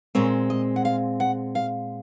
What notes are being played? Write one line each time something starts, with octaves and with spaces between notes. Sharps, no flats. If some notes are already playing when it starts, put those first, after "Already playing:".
A#2 G#3 C4 C#5
D#5
F#5
F5
F#5
F5